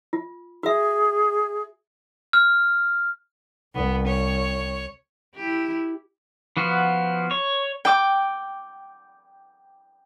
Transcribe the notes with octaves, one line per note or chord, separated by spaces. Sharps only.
F4
F#4 G#4 E5
F6
C2 B3
C#5
E4 G4
F3 B3 F#4
C#5
G5 D6